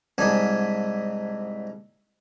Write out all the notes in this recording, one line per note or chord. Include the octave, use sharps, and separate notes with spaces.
C2 G#2 D4 D#4 G#5